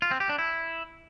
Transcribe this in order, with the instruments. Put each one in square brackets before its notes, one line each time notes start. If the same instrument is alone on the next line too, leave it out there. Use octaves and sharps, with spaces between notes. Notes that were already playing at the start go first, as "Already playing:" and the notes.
[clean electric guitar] F4
C4
G4
D4
E4